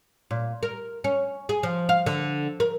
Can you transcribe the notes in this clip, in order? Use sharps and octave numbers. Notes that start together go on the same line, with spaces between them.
A#2
A#4
C#4
G#4
F3
F5
D3
A#4